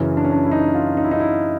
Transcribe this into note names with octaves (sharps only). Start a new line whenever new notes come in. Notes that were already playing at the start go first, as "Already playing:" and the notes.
Already playing: F#2 C#3 E3 C#4
D4
C#4
D4
E4
D#4
F4
D#4
E4
D#4
E4